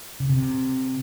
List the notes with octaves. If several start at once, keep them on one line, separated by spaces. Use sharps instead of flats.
C#3
C3